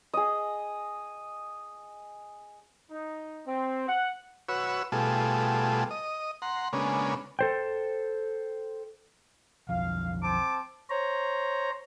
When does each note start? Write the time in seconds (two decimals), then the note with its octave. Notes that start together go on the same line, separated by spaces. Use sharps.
0.14 G#4 D#5
2.91 D#4
3.46 C4
3.88 F#5
4.49 F#4 B4 C#5 E6
4.92 B2 G3 A3 F4 G#4 A4
5.91 D#5
6.42 F#5 A#5 C6
6.73 C#3 G#3 A#3 B3 C#4 D4
7.39 A4 C5 G5
9.69 B1 F2 F3 F5
10.23 C4 A5 D6
10.90 C5 C#5 A#5